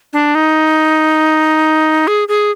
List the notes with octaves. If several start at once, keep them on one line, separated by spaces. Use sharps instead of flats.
D4
D#4
G#4
G#4